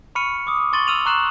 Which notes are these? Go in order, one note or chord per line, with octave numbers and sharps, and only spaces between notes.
B5 C#6 F6 C#7 D#7
D6 D#6
C6 C#6 A6 D#7 F#7 G7
E6 F6 D#7 F7 F#7
A#5 C#6 F#6 C7 E7 F#7